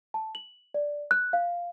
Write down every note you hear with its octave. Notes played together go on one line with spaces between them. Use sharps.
A5
F#7
D5
F#6
F5